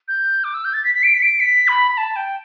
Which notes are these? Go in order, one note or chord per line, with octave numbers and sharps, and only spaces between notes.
G6
D6
E6
G6
A6
B6
B6
D7
B6
D7
B6
B5
B5
A5
G5